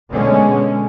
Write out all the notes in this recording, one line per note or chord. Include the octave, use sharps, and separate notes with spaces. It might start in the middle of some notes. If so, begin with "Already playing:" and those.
B2 D3 G#3 C#4